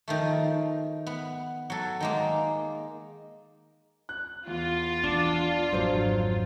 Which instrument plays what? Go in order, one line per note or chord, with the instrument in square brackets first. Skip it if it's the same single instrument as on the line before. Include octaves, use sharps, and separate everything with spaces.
[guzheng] D#3 F3 A3
B3
F#3 A4
D#3 G#3 A#3
[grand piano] F#6
[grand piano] E2 [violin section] F4
[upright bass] E3 [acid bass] D4
[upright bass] G#1 F2 [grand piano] F#3 C5